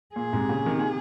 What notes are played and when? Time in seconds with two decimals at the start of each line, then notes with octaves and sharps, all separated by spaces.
0.15 A#2 G#4
0.33 G#2 C3
0.49 A#2 C#3
0.66 C3 D#3
0.79 A#2
0.83 C3